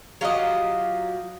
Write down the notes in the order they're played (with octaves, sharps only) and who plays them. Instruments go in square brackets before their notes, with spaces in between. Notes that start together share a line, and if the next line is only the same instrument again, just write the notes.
[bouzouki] F#3 F4 G4 D#5